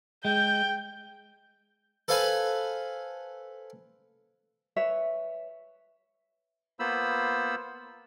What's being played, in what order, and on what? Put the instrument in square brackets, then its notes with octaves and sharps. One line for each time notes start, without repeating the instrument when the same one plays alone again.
[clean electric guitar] G#3 [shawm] G5 [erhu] G6
[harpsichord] A4 B4 C5 F5 G#5 B5
[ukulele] B4 C#5 E5
[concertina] A#3 B3 F4 C5 B5 E6